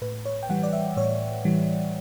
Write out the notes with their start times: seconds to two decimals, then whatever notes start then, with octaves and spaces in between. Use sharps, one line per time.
0.01 A2 B4
0.25 C#5
0.43 G5
0.49 E3 G3 F#5
0.63 D5
0.73 E5
0.97 A2 C#5
1.45 E3 G3